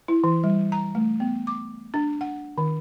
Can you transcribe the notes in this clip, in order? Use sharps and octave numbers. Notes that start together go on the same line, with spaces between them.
E4
E3
G3
A#5
A3
B3
D6
D4
F#5
D#3